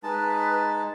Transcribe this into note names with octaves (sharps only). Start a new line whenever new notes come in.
G#3 D#4 B4 A5